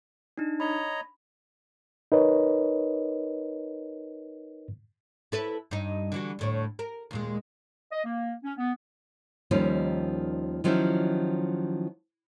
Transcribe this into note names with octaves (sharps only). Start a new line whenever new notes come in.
D4 D#4
C#5 D#5 A#5 B5
D#4 A#4 B4 C#5 D#5
E4 A4 B4
G2 D#4
D3 E3 F#4
D2 A2 C#5
A#4
D#2 A#2 G#3
D#5
A#3
C#4
B3
D#2 D#3 F3 G3 C#4
D#3 F3 F#3 C#4 E4